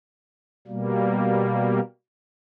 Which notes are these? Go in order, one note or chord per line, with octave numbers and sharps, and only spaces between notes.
B2 G3 A#3